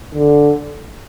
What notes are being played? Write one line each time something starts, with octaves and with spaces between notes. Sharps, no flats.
D3